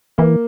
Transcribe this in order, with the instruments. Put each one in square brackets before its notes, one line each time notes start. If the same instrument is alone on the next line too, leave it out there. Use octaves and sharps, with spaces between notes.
[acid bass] E3 [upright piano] A#3